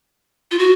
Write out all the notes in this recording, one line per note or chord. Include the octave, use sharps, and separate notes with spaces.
F4
F#4